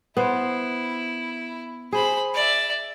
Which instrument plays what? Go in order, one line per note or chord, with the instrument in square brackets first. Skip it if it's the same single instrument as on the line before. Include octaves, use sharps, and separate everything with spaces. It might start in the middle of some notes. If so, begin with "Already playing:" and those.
[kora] B3 C5 [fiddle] E4
[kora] G#4 [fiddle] C5 B5
[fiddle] D5 E5